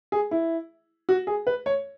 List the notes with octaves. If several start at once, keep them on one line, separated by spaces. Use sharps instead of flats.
G#4
E4
F#4
G#4
B4
C#5